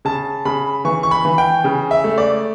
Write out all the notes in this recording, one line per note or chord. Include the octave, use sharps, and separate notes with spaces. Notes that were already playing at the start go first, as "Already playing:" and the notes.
C#3 A5
C#3 B5
E3 C#6
C#6
B5
E3
G5
C#3
E5
A3
D5